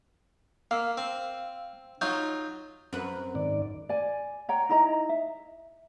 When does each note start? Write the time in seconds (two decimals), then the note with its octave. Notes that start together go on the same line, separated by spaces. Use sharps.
0.71 A#3 F5 E6
0.97 C4
2.01 F#3 D#4 F4 G6
2.93 F#2 C4 B4
3.35 G#2 D#3 D5
3.89 D5 G#5
4.49 C#5 F#5 G5 A#5
4.69 D#4 E4 D#5 A#5
5.09 E5